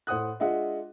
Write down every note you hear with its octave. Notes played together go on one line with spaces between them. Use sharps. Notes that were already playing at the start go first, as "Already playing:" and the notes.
A2 C5 F#5 D#6 F#6
G#3 D4 F4 D#5 E5 F#5